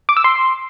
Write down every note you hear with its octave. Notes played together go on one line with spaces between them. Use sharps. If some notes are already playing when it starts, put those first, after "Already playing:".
D6
E6
C6